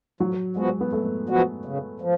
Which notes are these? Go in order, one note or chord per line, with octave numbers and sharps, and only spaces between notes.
F2 F#3
F3 G#3 B3 F#4
B3
F2 A3
F3 B3 F#4
C#3
F3